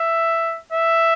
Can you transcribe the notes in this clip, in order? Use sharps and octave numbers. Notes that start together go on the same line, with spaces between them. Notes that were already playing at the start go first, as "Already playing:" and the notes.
Already playing: E5
E5